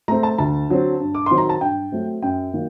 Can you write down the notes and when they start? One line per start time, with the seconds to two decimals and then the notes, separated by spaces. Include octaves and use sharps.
0.08 A3 C4 A#5
0.23 A5
0.38 D2 A5
0.69 D3 F#3 C4
1.00 G2
1.14 D6
1.26 D#3 F#3 C4 C6
1.38 A#5
1.49 A5
1.61 G2 G5
1.92 F#3 A3 C4
2.22 F#2 G5
2.53 D#3 F#3 A#3